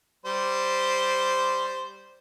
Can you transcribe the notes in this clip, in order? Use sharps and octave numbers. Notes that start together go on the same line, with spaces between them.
G3 C5